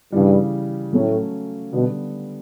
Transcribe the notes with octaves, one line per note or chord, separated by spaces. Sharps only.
G2 C#3 E3 G3
A2 F#3 A3 C#4
B2 D3 G3 B3